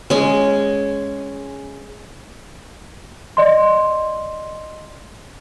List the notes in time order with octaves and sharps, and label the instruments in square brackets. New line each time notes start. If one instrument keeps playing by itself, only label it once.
[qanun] G#3 C#4
[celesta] D5 D#5 C6